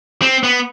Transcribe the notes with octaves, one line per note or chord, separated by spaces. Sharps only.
C4
B3